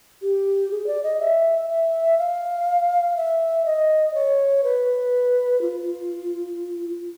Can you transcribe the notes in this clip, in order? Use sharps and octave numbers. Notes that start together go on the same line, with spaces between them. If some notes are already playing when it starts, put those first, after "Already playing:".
G4
G#4
D5
D#5
E5
E5
F5
E5
D#5
C#5
B4
F4